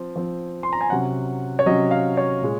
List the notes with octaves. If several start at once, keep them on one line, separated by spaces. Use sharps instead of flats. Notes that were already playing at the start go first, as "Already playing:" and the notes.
Already playing: F3 C4
F3 C4
C6
A#5
G#5
C3 F#3 C#4 F#5
C#5
C3 F#3 C#4 D#5
F5
C#5
A#2 G#3